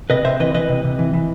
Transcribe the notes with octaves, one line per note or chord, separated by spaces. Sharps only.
C3 B4 D#5
C3 C5 E5
E3 B4 D#5
E3 B4 D#5
C3
C3
E3
E3